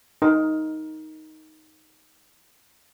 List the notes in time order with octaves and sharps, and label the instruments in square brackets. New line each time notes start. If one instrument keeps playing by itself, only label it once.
[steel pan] D#4 A#4